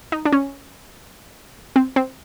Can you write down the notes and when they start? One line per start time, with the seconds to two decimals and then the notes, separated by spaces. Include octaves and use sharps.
0.12 D#4
0.25 D4
0.33 C#4
1.76 C4
1.96 C4